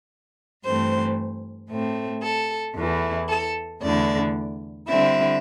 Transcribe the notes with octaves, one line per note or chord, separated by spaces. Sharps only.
G2 E3 A3 C4 C5
A2 A3 C4
A4
E2 E3 A3 E4
A4
E2 D3 A3 E4 D5
D3 G3 C4 E4 E5